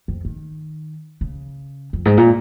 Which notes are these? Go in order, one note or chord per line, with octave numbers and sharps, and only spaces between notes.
F2
D#3
C#3
F2
G#2
A#2